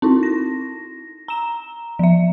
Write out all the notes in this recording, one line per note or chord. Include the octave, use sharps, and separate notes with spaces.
C4 D#4 E4
A#6
A#5 E7
F3 E5